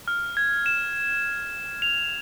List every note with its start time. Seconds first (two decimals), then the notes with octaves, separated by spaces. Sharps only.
0.08 F6
0.37 G#6
0.66 E7
1.82 F7